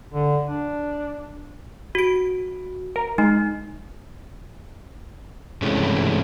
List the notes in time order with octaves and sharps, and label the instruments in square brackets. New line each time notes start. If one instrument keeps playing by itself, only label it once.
[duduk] D3
D4
[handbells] F#4 D7
[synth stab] A#4
[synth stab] G#3 [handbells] D#4
[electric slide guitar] G2 C3 E3 G#3 A3 C#4